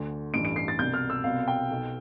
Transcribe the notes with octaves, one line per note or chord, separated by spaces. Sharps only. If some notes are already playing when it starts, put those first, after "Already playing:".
Already playing: D2 D3
A1 G2 E3 D7
D7
C7
A6
C2 B2 G6
F6
E6
C2 B2 F5
G5
B1 B2